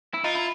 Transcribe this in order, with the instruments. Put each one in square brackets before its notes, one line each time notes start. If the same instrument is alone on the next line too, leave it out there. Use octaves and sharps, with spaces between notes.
[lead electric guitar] E4
[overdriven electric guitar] D#4 [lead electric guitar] F4
[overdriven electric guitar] E4